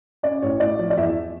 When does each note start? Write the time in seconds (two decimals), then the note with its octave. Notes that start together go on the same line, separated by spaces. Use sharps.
0.23 C#4 D5
0.42 A1 C#5
0.60 A2 D5
0.79 F3
0.90 D5
0.97 E2 E5